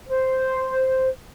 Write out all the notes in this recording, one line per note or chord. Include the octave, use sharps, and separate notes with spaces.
C5